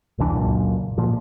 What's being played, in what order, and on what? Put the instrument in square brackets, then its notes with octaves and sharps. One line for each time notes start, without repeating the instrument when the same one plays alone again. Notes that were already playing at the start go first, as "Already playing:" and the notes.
[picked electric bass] E1 C2 E3 D4
C#2 F#2 A#2
A#2 F3